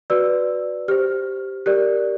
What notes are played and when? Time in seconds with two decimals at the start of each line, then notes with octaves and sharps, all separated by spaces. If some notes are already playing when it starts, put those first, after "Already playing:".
0.10 F#4 B4 D5 E6
0.88 G4 C5 F6
1.66 G4 A#4 D5 F#6